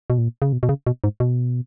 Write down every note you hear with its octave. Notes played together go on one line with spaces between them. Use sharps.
B2
A#2
C#3
B2
B2
C#3
B2
G#2
B2